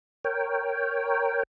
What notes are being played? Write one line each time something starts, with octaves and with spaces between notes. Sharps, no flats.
A#4 C#5 G5